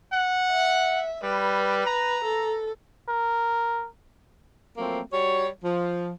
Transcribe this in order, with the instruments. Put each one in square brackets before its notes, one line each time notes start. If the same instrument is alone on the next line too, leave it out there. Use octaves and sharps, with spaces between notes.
[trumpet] F#5
[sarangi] E5
[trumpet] G3 [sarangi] B4
[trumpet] A#5
[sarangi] A4
[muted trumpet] A#4
[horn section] F3 F#3 A3 A#3 C4
G3 F#4 C#5
F3